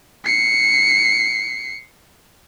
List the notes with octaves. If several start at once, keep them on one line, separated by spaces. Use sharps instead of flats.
C7 C#7